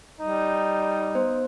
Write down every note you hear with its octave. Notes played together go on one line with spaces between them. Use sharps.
G3 D#4
B3 C5